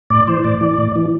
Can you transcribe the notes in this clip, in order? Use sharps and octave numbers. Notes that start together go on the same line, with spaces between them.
A2 D5
E3 C5
A2 D5
E3
A2
E3